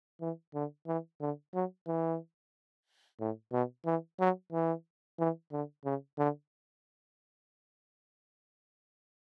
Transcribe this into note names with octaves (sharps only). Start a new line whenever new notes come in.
E3
D3
E3
D3
F#3
E3
A2
B2
E3
F#3
E3
E3
D3
C#3
D3